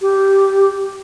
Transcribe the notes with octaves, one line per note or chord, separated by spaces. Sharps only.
G4